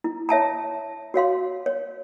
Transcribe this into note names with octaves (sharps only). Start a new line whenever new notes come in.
E4
C#5 E5 A5 A#5
F#4 C#5 F5 C6
C#5